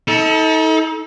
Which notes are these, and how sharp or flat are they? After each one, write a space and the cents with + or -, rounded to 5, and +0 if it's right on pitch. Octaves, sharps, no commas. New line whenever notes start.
D#4 +40 A4 +0